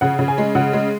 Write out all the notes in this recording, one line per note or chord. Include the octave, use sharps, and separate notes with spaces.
C#3 F#5
C#3
G#5
G#3
C#3 F#5
G#3